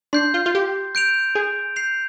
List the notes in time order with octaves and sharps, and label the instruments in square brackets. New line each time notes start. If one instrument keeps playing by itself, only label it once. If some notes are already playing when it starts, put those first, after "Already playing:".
[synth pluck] D4 [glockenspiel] C6 G6 C7
[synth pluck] F4
F4
G4
[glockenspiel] G6 D7 F7
[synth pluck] G#4
[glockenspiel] G6 C7 F7